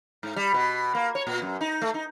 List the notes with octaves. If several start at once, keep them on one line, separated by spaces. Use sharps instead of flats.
G#2
G3
B2
A#3
C#5
A#2
F#2
D#4
A3
D#4